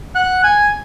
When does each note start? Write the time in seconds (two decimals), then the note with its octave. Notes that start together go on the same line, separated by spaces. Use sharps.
0.15 F#5
0.43 G#5